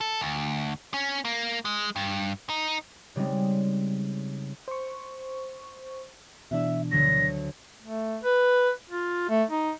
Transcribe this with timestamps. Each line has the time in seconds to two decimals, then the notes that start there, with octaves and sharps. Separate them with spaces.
0.01 A4
0.21 D2
0.94 C#4
1.25 A#3
1.65 G#3
1.96 G2
2.49 D#4
3.16 C#3 G3 G#3 C4 D#4
4.68 C5 C#6
6.51 B2 E3 D4 E5
6.91 D2 D3 F#3 A#6
7.82 A3
8.23 B4
8.90 F4
9.29 A3
9.50 D#4